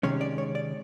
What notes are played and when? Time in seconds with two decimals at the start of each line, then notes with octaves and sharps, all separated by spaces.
0.03 C3 D#3 G#3 C#4 C#5
0.21 D5
0.38 C#5
0.55 D5